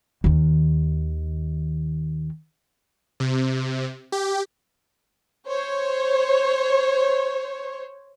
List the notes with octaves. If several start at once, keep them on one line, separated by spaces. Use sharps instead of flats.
D#2 D#3
C3
G4
C5 C#5